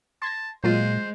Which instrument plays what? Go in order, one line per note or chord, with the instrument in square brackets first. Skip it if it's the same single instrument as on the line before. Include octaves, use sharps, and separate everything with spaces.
[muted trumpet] A5 [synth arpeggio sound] C6 G#6 A#6
[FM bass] A#2 [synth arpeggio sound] F#3 F4 [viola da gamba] G#3 [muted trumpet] C5